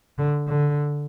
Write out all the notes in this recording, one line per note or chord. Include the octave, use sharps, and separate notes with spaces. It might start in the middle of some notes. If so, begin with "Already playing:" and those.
D3
D3